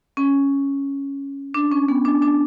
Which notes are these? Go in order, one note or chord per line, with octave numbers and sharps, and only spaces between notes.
C#4
D4
C#4
B3
D4
D4